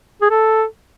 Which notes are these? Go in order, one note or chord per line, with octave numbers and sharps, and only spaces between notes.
G#4
A4